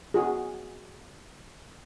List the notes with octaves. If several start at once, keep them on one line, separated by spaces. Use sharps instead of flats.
F#4 G#4